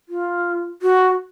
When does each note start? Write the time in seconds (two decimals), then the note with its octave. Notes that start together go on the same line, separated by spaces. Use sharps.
0.09 F4
0.82 F#4